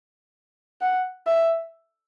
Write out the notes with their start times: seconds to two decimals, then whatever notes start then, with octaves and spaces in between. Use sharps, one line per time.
0.81 F#5
1.27 E5